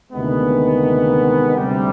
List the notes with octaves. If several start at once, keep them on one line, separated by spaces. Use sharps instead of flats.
D2 C3 D#3 G#3 B3
D2 C3 G3